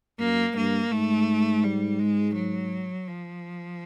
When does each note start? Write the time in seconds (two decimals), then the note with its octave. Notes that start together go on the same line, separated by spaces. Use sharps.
0.20 F#2 A#3
0.56 G2 A#3
0.92 G#2 A3
1.64 G3
1.99 G#3
2.36 F#3
3.08 F3